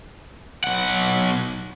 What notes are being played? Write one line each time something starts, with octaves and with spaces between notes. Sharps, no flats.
B1 F#5